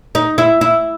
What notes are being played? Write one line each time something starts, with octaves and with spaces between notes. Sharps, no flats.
D#4
E4
E4